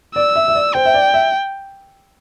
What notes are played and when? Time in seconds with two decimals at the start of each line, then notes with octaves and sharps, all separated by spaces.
0.16 D5 E6
0.36 E5
0.48 E5
0.55 D5
0.75 C5 G5
0.86 E5
0.94 D5
1.14 E5